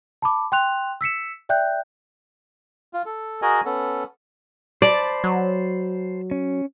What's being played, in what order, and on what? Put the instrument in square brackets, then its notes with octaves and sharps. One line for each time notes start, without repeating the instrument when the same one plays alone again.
[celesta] A5 B5 D6
G5 C6 F#6 F7
E6 B6 C#7 E7
D5 E5 G5 F#6 G6
[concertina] F4
A4
F#4 G#4 A#4 D#5 G#5
B3 C#4 A4
[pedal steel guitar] C5 A5 B5 [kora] D5
[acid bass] F#3
[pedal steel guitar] C#4